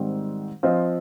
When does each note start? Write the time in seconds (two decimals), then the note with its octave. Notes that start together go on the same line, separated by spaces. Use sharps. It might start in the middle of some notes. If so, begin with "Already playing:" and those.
Already playing: G#2 D#3 G3 C4
0.63 F3 C4 F4 C5 D#5